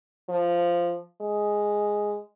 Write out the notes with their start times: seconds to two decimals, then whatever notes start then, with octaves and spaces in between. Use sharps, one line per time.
0.29 F3
1.21 G#3